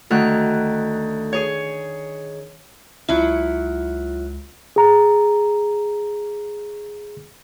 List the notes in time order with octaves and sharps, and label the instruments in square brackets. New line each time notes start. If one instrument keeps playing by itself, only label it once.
[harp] D2 D#3 F#6
G#4 C#5
[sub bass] C#2 [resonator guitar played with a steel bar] F#3 E4 [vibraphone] F4
[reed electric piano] G#4 A#5